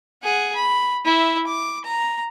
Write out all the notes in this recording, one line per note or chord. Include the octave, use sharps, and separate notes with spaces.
G#4 F#5
B5
E4 E5
D6
A#5